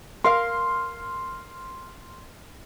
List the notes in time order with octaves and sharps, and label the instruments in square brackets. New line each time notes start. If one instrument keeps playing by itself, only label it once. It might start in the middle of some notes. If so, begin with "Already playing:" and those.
[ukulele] A#4 F5 [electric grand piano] C6 F6